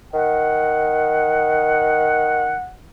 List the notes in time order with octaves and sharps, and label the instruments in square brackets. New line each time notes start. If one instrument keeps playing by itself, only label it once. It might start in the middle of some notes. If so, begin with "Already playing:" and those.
[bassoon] D#3 [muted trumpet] F#5